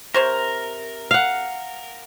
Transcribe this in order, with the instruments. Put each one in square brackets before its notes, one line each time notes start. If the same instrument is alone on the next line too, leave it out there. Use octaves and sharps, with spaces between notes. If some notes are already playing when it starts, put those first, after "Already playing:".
[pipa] C3 C5 C#5 [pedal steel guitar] A#4
[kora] F5 F#5